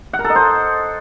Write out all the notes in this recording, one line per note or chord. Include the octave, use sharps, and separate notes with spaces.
F#5
A#4
A4
D#5
C5